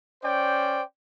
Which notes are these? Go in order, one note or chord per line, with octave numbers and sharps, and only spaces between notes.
C#4 C5 D5 G5